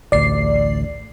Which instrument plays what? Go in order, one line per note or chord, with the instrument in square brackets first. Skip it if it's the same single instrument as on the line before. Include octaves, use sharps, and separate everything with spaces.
[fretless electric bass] A1 D2 [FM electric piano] D5 C7